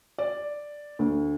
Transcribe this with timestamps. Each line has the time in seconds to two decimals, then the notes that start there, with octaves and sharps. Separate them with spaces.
0.18 D5
0.99 D2